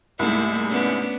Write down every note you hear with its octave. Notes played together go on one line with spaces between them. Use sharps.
C2 G#2 A3 A#3 E4
B3 C#4 D4